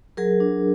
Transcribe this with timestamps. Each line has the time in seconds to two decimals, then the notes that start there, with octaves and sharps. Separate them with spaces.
0.17 F#3 G#4 A#4
0.40 D4